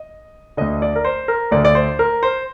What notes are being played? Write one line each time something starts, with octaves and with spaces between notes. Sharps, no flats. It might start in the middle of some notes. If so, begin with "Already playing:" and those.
Already playing: D#5
D2 D3 D#5
D5
A#4
C5
A#4
D2 D3 D5
D5
C5
A#4
C5